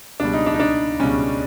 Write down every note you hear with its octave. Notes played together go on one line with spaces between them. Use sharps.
C#2 B2 G3 D4
D#4
D4
D#4
D4
C#2 B2 G3 C#4